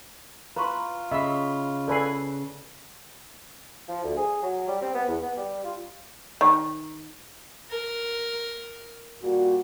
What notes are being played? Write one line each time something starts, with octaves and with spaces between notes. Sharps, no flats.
F4 B4 A#5 C6 C#6
C#3 D#5 E5 B5
A4 B4 D5 G#5 C7
F3
D2
G#4
F#3
G3
C4
B3
E2
B3
G3
F4
D#3
A#4
A#2 G3 F#4